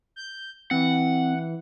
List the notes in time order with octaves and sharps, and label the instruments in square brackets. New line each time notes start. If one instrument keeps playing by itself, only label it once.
[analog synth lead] G6
[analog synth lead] E3 [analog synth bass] C4 [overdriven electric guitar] F#5